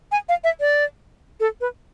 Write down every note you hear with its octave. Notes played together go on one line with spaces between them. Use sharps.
G#5
F5
E5
D5
A4
B4